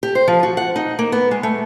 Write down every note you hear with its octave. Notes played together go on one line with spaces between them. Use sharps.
G4
C5
F3
F#4
F#5
D#4
A#3
B3
G#3
A3